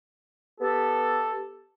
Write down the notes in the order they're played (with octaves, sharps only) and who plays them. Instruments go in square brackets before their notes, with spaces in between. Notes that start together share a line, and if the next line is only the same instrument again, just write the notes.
[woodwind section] B3 G4 A4